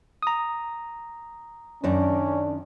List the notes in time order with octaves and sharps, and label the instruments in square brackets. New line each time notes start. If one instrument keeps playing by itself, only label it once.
[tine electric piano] A#5 D#6
[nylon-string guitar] F#2 D#3 D5 [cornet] C#4 [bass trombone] D4